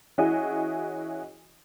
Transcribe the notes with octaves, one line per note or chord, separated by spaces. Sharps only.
E3 C#4 E4 F#4 G#4 D#5